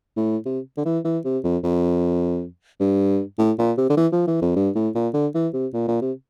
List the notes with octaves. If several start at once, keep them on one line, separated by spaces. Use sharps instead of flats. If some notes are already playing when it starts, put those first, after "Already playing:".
A2
C3
D3
E3
E3
C3
F2
F2
G2
A2
A#2
C3
D3
E3
F3
E3
F2
G2
A2
A#2
D3
E3
C3
A#2
A#2
C3